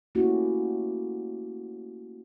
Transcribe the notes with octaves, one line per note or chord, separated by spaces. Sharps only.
A3 A#3 C#4 E4 F#4 G4